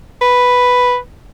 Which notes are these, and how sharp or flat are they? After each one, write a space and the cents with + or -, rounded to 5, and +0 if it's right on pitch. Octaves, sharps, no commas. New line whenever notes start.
B4 +0